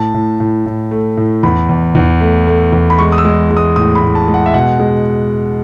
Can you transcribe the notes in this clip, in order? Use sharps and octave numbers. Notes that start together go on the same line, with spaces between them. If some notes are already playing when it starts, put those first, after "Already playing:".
Already playing: A2 A5
A2
A2
A2
A3
A2
E2 B5
E2
E2
A3
A3
E2
B5
G#3 C#6
D#6
E6
G#3
G#3
D#6
A2 D#6
B5
A2
A5
G#3
F#5
E5
B2 F#5
G#3